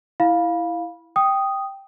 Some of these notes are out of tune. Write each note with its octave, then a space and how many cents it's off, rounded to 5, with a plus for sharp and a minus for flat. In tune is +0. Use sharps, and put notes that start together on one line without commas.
E4 +0 F5 +5 B5 -20
G5 +0 D#6 +0